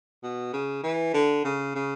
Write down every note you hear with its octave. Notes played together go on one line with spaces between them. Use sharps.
B2
C#3
E3
D3
C#3
C#3